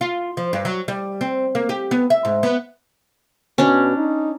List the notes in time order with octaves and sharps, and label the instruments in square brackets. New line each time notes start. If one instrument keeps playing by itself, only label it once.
[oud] F4
F3
G2
F#3
G3
C4
A#3
G4
B3
E5
G#2
B3
[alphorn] B2 [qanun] C#4 D4
[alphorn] D#4